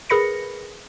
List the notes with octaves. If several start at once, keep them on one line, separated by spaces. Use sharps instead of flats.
G#4 A#4 B4 B5 A#6 C#7